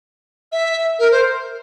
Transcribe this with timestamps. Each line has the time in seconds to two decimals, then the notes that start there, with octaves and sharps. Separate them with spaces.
0.52 E5
0.99 A#4
1.11 C5